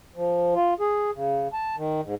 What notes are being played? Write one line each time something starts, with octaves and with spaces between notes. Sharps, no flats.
F3
F4
G#4
C#3
A5
D#3
G#2